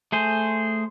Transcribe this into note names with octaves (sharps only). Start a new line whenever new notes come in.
A3 G#4 C5